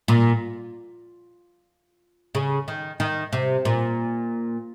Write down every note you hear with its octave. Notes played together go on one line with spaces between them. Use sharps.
A#2
C#3
D#3
D#3
C3
A#2